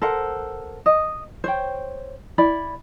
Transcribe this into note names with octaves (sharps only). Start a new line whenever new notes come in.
A4 A#4 C5 F#5
D#5
C5 C#5 G5
E4 D5 B5